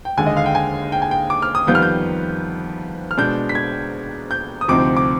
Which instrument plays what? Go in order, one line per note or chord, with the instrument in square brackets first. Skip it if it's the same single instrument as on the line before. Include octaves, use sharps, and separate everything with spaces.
[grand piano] G5
D#2 D3 G#3 G#5
D#5
F5
G5
G#5
G5
G#5
G5
D6
F6
D#6
F2 D#3 G3 B3 F4 G6
F6
G6
F6
B2 G#3 D4 G6
B6
G#6
G6
D#6
D2 C3 F3 C4 D#4 D6
D6